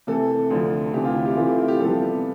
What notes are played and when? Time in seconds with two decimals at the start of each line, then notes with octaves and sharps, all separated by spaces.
0.07 C3 E3 A3 A4
0.50 D2 D3 F3
0.93 D2 C3 E3 G4
1.04 F4
1.15 E4
1.25 G4
1.36 C3 E3 A3 F4
1.47 E4
1.58 F4
1.68 G4
1.79 C2 C3 F3 B3 A4